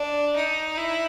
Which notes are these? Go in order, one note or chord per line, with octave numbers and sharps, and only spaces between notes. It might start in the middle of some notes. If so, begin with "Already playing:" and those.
Already playing: D4
D#4
E4